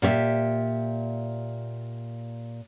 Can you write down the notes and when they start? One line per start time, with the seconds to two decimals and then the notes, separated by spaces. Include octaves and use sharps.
0.02 A#2 G4 C#5 E5